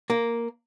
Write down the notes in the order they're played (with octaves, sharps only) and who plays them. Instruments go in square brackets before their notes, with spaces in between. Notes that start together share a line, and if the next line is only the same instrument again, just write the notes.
[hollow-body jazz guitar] A#3